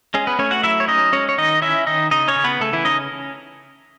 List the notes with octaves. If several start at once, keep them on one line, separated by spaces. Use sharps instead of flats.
G#3 C#4 G#4
B3 B4
A3 C#4 C#5
F#4 F#5
F#3 E4 E5
C#5
C#4 D#4 D#5
G#3 C#4 C#5
C#5
D#3 D#4 D#5
C#4 E4 E5
D#3 D#4 D#5
C#3 D#4 D#5
C#4 C#5
C#3
B3 B4
C#3 A3 A4
E3 E4
C#4 D#4 D#5